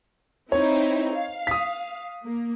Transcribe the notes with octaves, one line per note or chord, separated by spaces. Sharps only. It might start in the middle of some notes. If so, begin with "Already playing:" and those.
C4 D#4 E4 C#5
F5
D#6 B6
A#3